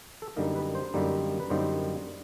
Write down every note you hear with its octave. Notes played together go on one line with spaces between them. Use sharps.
A4
F#2 D3 G3 A#3 D#4 A#4
B4
C5
F#2 D3 G3 A#3 D#4
B4
F#2 D3 G3 A#3 D#4 C5